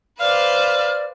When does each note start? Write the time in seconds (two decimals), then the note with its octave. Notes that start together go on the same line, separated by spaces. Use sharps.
0.20 B4 C5 D5 F5 F6